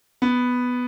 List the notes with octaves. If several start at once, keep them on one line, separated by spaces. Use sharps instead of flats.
B3